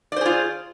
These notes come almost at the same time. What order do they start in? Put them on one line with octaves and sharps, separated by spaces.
D5 C5 G#4 F4